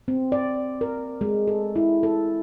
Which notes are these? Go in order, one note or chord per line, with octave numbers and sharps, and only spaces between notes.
C4
D5
A#4
G#3
A4
E4
A4